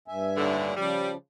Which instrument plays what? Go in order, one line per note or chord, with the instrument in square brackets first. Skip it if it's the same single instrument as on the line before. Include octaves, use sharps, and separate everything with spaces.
[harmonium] G2 E5 G#5
[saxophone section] D#2 A2 D3
[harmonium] C#3 F3 [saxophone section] G3